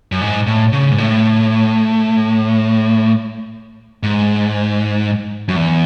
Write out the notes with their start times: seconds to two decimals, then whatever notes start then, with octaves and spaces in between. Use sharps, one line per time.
0.12 F#2
0.21 G#2
0.47 A2
0.73 C#3
0.91 G#2
0.98 A2
4.03 G#2
5.48 F#2
5.56 E2